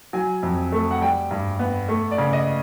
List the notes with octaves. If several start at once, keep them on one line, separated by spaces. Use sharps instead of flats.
F#3 G#5
F2
A3
F#5
G3 G5
G2
B3
A3
D5
C#3
D#5